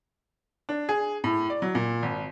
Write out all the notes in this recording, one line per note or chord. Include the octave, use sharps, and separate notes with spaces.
D4
G#4
A2
D5
F#3
A#2
G#1